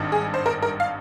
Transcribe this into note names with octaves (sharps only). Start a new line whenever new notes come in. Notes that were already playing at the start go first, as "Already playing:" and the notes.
Already playing: G#1 G2 D#3
G#4
C5
A#4
A#4
F5